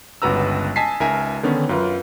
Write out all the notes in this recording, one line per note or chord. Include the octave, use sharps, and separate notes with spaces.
G1 C#2 F#4 B4 A#5 E6
D#5 G#5 A5 B6 C7
C#2 D#4 A#4 E5 G#5
D3 D#3 B3 C#4
F#2 F4 B4